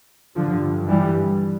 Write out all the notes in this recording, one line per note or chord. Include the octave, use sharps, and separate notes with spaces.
G2 D3 F3
E3 G3